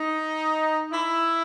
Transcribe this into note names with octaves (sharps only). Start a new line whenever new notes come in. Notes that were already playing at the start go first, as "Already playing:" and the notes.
Already playing: D#4
E4